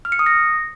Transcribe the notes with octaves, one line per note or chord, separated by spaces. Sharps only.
F6
C#7
D#6
A#6